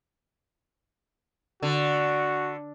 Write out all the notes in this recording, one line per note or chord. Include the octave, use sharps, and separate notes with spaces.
D3 F#4